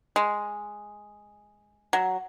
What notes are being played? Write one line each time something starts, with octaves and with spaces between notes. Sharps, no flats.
G#3
F#3